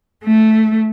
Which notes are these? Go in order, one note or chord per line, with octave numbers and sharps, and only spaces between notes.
A3